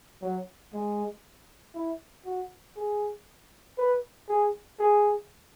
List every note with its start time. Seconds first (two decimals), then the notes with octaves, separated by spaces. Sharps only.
0.22 F#3
0.73 G#3
1.75 E4
2.25 F#4
2.76 G#4
3.78 B4
4.29 G#4
4.80 G#4